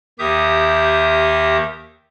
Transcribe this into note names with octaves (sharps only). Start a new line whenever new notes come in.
D#2 D#3 G4 E5 D#6 G6